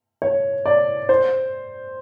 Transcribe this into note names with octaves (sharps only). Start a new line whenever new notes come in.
C#5
D5
C5